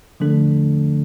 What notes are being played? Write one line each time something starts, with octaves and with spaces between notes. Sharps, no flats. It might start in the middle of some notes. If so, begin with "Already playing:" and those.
D3 F3 A3 D4 A4